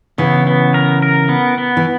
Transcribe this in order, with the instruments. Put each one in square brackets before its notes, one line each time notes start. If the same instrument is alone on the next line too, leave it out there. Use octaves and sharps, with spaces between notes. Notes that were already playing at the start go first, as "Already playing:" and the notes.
[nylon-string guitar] C#3 E3 [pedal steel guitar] B3
[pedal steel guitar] B3
A#4
A#4
B3
B3
[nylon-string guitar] E3